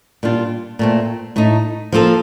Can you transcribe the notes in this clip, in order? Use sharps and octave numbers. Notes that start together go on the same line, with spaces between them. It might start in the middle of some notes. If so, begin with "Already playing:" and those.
A#2 G3 D4 F4
A#2 A3 C4
A2 A3 D#4
F3 A#3 F4 A4